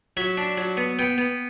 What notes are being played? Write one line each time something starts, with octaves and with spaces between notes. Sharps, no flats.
F#3 E5
D4
F#3
B3
B3 G5
B3